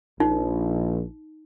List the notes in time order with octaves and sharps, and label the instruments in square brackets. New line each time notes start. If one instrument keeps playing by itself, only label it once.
[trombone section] A#1 [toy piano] D#4